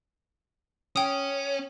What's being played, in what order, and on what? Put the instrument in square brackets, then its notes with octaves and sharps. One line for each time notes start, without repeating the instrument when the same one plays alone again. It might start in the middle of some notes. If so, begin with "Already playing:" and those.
[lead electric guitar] C#4 [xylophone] G5 D#6